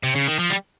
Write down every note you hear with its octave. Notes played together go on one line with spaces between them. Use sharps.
C3
C#3
D#3
F3
G3